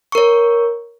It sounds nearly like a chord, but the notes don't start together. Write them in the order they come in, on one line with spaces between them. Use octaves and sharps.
C#6 A#4 C#5